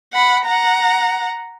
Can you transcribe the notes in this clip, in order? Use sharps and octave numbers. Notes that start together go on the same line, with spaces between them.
F#5 B5
F#5 A#5